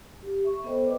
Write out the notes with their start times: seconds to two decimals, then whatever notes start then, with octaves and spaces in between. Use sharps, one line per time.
0.23 G4
0.45 E5 C#6
0.64 B3 A4 C5 D#5 G5
0.83 B4 D5 D6